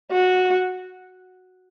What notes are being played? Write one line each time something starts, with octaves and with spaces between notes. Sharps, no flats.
F#4